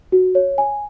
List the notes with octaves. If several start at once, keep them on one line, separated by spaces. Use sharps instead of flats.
F#4
C#5
G#5